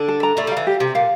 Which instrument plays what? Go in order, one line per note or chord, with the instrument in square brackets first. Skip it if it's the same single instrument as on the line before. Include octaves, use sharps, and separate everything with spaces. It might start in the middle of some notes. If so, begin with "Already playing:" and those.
Already playing: [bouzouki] D3 D4
[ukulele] A4
A#5
[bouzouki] A2 A3 [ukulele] D5
[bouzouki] G3
[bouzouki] E3 [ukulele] F5
[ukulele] G4
[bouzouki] C3 [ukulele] G4
[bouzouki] A#2 [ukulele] F5